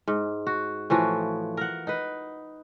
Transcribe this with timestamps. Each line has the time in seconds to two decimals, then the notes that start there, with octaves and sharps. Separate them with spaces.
0.08 G#2
0.47 F#4
0.90 A2 E3 F3 F#4
1.57 A#4 F#5
1.87 D#4 B4